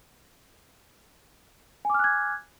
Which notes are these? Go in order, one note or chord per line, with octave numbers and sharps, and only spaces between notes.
G#5 D6 F6 F#6 G#6